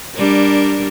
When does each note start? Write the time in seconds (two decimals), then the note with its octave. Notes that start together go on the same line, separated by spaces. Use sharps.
0.16 G3 D4 A#4